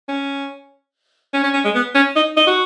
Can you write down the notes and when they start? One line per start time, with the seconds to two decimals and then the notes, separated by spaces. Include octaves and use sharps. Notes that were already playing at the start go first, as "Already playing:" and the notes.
0.08 C#4
1.33 C#4
1.43 C#4
1.54 C#4
1.65 G#3
1.75 B3
1.95 C#4
2.16 D#4
2.37 D#4
2.47 F#4